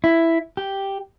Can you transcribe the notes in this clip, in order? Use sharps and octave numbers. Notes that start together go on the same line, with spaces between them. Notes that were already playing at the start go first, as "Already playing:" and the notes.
E4
G4